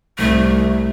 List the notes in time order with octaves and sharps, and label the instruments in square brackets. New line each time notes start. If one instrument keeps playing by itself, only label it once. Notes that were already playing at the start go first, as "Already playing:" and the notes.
[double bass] C2 [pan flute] A3